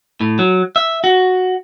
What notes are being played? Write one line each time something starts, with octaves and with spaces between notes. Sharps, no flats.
A2
F#3
E5
F#4